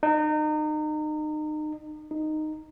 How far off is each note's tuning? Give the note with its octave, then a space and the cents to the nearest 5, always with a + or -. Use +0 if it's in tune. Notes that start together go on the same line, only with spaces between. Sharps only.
D#4 -30
D#4 -10